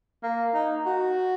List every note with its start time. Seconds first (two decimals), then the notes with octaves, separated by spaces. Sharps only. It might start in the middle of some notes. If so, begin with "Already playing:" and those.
0.23 A#3
0.54 D#4
0.86 F#4